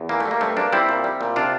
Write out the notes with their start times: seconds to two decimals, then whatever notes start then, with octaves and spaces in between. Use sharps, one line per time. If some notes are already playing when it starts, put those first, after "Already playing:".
Already playing: E2
0.09 E3 A#3
0.20 A3
0.25 G3
0.31 A#3
0.41 G2 A3 C4
0.57 G2 A#3 D4
0.73 G3 C4 E4
0.89 A#2
1.04 G3
1.21 A#2
1.36 C3 D4 F4